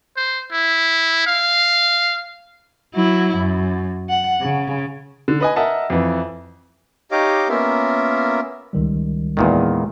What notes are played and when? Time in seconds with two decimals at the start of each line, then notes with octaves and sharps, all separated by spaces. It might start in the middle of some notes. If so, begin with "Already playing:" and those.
0.17 C5
0.52 E4
1.27 F5
2.95 F#3 E4
3.37 F#2
4.09 F#5
4.41 C#3
5.28 D3
5.40 B4 D#5 G#5
5.56 A#4 D#5 E5 F#5 A5
5.90 F2 E3
7.12 D#4 G4 C#5 D#5 F5 D6
7.49 A#3 B3 C#4 F4 A#4 E5
8.73 C#2 D#3 G3
9.37 E2 A#2 D#3 G#3